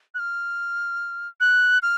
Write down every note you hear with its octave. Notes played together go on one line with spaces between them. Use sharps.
F#6
F6
F#6
F6